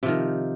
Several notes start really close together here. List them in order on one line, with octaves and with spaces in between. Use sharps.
C3 F3 D#3